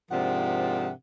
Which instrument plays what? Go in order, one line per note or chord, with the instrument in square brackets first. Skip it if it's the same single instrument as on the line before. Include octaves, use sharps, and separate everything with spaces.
[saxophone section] G#2 C3 F3 D4 A#4 F#5